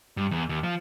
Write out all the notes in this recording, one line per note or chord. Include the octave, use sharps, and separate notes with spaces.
G2
E2
D#2
F3